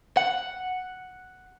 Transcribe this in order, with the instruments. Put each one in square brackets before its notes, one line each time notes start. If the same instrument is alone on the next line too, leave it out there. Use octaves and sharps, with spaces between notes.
[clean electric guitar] F#5